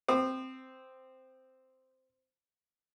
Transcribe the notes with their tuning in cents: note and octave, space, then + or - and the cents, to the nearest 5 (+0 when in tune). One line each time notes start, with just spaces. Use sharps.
C4 -5 D#6 -40